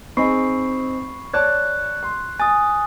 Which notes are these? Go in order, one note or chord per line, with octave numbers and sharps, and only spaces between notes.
C4 D#4 G#4 B5 C#6 C7
C#5 D5 A5 F#6 G#6
C6
G#5 D#6 A6